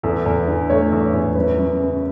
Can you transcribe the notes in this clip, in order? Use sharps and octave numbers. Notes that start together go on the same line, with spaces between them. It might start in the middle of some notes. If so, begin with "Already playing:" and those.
E2 A4
E2
D3
A3 C#5
E2
E2
F#2 B4
F#2
C#3